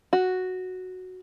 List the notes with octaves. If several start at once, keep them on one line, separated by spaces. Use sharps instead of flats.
F#4